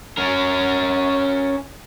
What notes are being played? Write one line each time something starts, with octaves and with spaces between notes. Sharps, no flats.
C#4 A#4